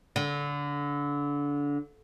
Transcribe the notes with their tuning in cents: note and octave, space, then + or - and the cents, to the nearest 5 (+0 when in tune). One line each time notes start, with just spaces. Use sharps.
D3 -25